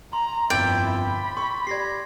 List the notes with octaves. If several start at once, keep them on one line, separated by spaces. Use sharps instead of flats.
A#5 C6
G1 F2 A#2 E4 G5 D6 A6 G7
B5
C6 C#6
G4 D5 G#6 A#6 C7